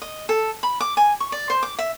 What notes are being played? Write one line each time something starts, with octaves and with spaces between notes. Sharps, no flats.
D#5
A4
B5
D6
G#5
C#6
D5
C5
D6
E5